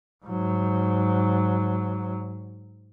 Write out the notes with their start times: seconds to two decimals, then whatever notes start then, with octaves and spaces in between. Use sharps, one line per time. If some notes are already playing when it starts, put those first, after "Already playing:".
0.26 G#2 F#3